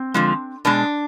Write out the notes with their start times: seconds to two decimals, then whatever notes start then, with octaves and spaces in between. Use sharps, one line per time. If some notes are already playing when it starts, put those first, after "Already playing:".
Already playing: C4
0.14 D3 F3 G#3
0.65 B2 G#3 D4